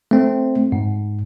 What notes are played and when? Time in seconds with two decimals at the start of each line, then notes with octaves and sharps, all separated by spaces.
0.11 A3 C4
0.72 G#2